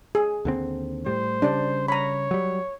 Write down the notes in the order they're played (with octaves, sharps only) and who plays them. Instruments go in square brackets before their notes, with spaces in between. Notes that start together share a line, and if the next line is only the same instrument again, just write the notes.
[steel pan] G#4
[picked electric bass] D#2 D3 C4
[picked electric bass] A2 G3 [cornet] C5
[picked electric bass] C#3 G3 [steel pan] D4 D5
[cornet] C#5 [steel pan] A#5 B5
[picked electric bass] F#3 G3